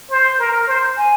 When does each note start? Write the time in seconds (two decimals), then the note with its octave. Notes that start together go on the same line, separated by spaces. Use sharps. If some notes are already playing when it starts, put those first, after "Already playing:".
0.10 C5
0.39 A#4
0.67 C5
0.97 G#5